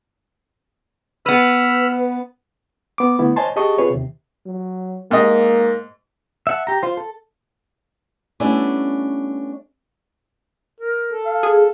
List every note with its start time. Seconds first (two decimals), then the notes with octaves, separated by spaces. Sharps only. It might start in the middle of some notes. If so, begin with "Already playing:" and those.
1.26 B3 B4 B5 E6 F6
2.98 B3 D6
3.19 D3 A3 B3 E4
3.36 C5 C#5 D#5 G#5 A5 C6
3.56 G4 G#4 D#5 A5 C#6 D#6
3.78 C4 F4 G#4 B4 C#5
3.90 D#2 C3
4.46 F#3
5.11 G#2 A#3 D#5
6.47 E5 F#5 A5
6.67 G4 A#5
6.83 F4 C5
6.97 A4
8.40 G3 A3 B3 C#4 D4 E4
10.80 A#4
11.11 A4
11.25 F5
11.43 G#4